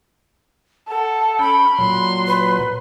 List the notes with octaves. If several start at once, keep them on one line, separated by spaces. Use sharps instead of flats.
A4 F#5
C#4 G5 B5
A#2 F#3 C6
B4